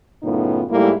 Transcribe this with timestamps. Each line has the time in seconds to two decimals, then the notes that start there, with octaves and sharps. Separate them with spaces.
0.23 F#2 A2 C#3 B3 D#4 F4
0.69 G#2 G3 A3 A#3 E4